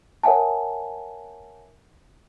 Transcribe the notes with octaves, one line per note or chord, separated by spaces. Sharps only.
A#4 C#5 E5 F#5 G#5 A5